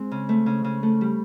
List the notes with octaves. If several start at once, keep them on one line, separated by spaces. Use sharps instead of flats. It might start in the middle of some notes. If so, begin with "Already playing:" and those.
Already playing: G#3 C4
C#3
A3
C#3
C#3
A3
G3